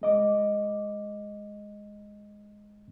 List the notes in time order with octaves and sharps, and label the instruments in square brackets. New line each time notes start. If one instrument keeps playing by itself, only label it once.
[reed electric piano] G#3 D#5 D6